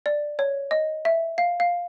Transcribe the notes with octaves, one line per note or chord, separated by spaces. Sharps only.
D5
C#5
D#5
E5
F5
F5